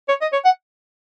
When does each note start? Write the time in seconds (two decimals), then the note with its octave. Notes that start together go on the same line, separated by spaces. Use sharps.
0.08 C#5
0.22 D#5
0.33 C#5
0.45 F#5